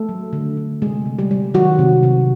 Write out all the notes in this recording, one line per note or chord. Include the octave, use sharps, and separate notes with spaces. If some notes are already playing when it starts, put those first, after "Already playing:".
Already playing: A3 A4
F#3
D3
D3
C3 G#3 G#4
C3
G3 G4
G3
D#3 F#3 F#4
C3
C3